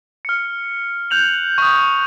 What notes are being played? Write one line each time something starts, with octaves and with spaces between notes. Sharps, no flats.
F6 C#7
F#6 G6 F7 F#7
C#6 D#6